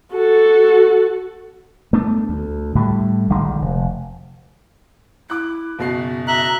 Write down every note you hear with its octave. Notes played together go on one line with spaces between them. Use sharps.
F#4 A4
A3 B3 D4
D2
A2 D3 G3
A#1 D3 D#3 G#3
F1
E4 D6 F#6
F#1 B2 F#4 C7
E5 A#5 F#6